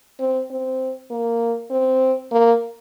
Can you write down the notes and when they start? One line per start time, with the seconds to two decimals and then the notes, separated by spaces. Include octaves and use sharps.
0.20 C4
0.50 C4
1.11 A#3
1.71 C4
2.31 A#3